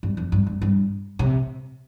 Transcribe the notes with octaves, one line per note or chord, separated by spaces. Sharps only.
G2
F2
G2
G2
G2
C3